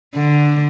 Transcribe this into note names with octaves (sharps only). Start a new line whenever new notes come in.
D3